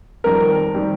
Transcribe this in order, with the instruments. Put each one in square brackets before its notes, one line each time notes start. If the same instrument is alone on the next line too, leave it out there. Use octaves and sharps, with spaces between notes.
[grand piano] F2 D#3 G3 C4 [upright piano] A#4
[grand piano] D#3 G3 C4